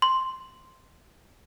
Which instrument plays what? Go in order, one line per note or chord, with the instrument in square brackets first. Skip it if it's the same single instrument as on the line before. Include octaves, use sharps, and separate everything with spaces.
[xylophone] C6